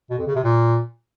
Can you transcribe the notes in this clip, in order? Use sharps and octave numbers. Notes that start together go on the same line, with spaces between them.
B2
F2
C#3
C3
A#2